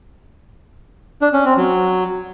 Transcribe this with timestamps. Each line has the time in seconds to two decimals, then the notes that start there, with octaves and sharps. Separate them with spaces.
1.22 D4
1.33 C#4
1.45 C4
1.57 F#3